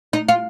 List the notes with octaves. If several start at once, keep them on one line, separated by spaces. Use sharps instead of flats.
D#4
F4